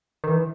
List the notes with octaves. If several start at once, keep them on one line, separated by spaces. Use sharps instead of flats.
D#3
E3